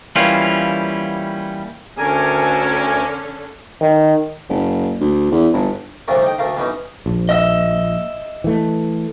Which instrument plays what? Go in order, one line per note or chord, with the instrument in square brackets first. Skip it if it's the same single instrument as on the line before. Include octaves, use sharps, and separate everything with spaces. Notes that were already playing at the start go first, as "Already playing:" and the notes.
[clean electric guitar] E3 G3 A#3 C#4 F4
[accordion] D2 A#4 G#5 [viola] D3 C#4
[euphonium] D#3
[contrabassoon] F#1
D2
E2
G1
[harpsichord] C2 F2 A#2 D3 A3 A#4
D#4 G5
D2 A3 A#4 F5
B2 E3 C#4 D#4
[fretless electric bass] A#1
[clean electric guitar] D#5 E5
[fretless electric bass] E3 A3